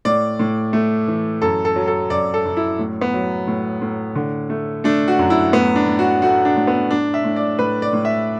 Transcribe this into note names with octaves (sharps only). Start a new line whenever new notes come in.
A2 D5
A2
A3
E3
F#2 A4
A4
F#3
A4
F#2 D5
A4
F#2
E4
A2
B3
F#3
A2
A2
D3
A3
A3 D4
F#4
F#2
E4
A2 B3
D4
A2
F#4
A3 F#4
D4
A2
B3
A2 D4
E5
A2
D5
A2 B4
D5
A2
E5